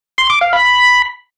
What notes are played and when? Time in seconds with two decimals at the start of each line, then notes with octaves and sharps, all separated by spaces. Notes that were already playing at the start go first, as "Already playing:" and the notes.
0.18 C6
0.30 D6
0.41 F5
0.53 B5